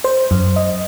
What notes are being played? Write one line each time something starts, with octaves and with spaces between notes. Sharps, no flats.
C5
F#2
D#5